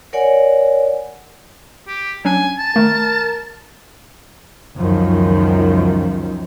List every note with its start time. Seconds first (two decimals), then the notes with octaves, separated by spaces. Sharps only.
0.13 A#4 C#5 D5 F#5 G#5
1.87 G4
2.25 F#3 C#4 D4 G#5
2.58 A5
2.76 D#3 A3 A#4
4.76 C#2 F#2 D#3 F3